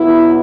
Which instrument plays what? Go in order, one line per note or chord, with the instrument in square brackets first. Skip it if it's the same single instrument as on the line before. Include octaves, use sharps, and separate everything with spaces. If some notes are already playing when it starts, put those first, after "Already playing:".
Already playing: [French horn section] B2 F#3 B3 E4